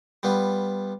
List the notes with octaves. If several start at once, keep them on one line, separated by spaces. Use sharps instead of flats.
G3 B3 F4